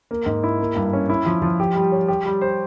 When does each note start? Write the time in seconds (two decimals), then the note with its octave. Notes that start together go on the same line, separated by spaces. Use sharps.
0.11 A#3
0.26 G#2
0.44 E4
0.60 A#3
0.76 G2
0.93 C#4
1.10 E4
1.26 F3
1.42 F3
1.60 G4
1.76 G3
1.92 C#5
2.08 G4
2.26 G3
2.41 C5